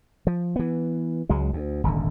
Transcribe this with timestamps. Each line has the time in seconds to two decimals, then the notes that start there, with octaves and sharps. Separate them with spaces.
0.27 F3
0.56 E3 B3
1.29 C#2 F#3 G#3
1.53 D2
1.84 D#1 G#1 D3